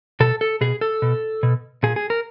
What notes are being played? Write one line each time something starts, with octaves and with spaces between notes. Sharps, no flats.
B2 A4
A4
B2 G#4
A4
B2
B2
A#2 G#4
G#4
A#4